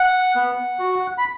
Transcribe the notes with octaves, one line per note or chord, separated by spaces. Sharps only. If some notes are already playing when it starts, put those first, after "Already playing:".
Already playing: F#5
B3
F#4
B5